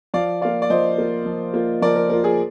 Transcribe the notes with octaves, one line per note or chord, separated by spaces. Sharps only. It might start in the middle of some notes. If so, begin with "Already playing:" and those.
F3 D5 F5
A#3 F4 D5 F5
D5
F3 C5 D#5
A#3 F4
F3
A#3 F4
F3 A#4 D5
A#4
A#3 F4 A#4
G#4